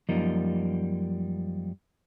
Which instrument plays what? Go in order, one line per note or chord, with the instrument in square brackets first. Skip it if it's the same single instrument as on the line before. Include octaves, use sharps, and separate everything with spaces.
[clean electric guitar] F#2 F3 G3 A#3 D#4